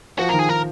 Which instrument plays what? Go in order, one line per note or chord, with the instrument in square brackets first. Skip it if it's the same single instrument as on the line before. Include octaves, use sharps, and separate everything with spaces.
[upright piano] F3 [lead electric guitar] F#4
[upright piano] D#3 [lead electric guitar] A#4
[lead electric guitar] G#4
[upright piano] D#3 [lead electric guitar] A#4